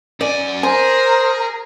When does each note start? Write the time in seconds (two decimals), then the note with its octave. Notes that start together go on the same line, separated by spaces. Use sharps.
0.21 F#2 D5 G#5
0.63 G#4 A#4 C5 G#5